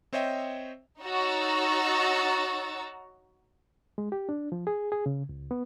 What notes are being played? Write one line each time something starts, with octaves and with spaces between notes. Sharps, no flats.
C4 C5 C#5 D#5 E5 G5
D#4 F#4 C#5 A#5 E6 A6
G#3
G4
D4
F3
G#4
G#4
C#3
C#2
B3